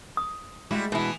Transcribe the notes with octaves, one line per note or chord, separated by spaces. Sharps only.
D#6
G3 G#3 E4 F#4
B2 E3 B3 E4